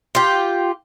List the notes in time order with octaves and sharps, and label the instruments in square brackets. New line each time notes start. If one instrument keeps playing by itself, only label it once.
[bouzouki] F4 G4